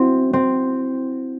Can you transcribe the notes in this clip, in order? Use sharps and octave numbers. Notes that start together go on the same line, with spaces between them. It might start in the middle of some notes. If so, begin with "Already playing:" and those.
Already playing: C4 E4 F#4
C4